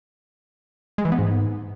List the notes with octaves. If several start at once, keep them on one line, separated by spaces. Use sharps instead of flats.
G#3
E3
B3
G#2